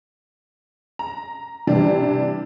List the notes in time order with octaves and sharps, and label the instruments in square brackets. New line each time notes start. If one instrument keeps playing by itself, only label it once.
[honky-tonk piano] A#5
C3 E3 G3 D4